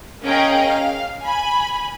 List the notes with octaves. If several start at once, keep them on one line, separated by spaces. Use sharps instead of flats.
C#4 G#4 A#4 D#5 F5 G5
F5
G#5 B5